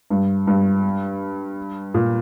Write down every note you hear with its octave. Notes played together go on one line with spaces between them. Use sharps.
G2
G2
A#2